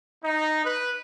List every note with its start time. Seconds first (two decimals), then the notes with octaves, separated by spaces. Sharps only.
0.24 D#4
0.65 B4